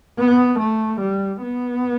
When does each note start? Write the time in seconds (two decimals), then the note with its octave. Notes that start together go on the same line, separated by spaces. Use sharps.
0.18 B3
0.59 A3
1.00 G3
1.42 B3